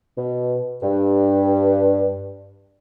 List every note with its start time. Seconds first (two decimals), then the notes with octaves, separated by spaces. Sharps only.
0.18 B2
0.82 G2